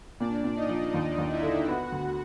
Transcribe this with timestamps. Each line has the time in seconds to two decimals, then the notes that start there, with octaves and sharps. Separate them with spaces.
0.20 A#2 D4 D5
0.44 A#2
0.57 D#4 D#5
0.69 F3
0.93 D#2 D#4 D#5
1.18 D#2
1.30 E4 E5
1.42 D3
1.68 B3 F#4 F#5
1.92 D2